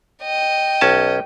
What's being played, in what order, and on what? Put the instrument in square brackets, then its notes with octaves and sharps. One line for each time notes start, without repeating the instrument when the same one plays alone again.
[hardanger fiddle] D#5 G5
[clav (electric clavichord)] B1 C#4 A5